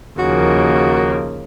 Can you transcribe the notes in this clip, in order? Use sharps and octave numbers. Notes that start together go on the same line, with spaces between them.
D#2 C#3 F3 A#3 F#4